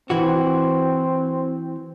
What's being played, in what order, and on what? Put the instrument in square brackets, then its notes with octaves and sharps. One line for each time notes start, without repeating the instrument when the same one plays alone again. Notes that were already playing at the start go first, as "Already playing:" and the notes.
[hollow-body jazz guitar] E3 F#4 [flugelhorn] C4